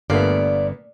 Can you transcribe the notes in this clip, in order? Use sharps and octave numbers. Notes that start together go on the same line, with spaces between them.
G1 G2 A#2 A3 B3 D5 F5